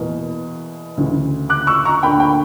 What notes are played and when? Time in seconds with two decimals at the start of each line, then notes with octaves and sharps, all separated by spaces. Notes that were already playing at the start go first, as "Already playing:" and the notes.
Already playing: E2 B2 A#3
0.97 D2 C#3 E3
1.49 D6 F#6
1.67 C#6 E6
1.85 A#5 C#6
2.03 D2 D3 A#3 D4 G5 B5
2.20 G5